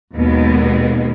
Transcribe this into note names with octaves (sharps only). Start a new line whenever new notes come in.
D#2 B2 D#3 G#3 B3